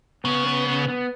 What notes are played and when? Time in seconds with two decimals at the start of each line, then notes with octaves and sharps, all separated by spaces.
0.24 C#3 B3
0.46 B3
0.67 B3
0.88 B3